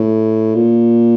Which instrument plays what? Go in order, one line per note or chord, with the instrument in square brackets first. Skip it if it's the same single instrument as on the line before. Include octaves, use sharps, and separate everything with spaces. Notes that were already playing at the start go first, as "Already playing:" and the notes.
Already playing: [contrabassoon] A2
A#2